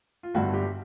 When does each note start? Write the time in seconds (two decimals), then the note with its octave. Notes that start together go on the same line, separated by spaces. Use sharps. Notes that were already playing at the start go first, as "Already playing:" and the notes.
0.23 F4
0.34 G1 G2 D3 F#4
0.54 G4